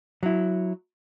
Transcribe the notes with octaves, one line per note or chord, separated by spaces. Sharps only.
F#3 E4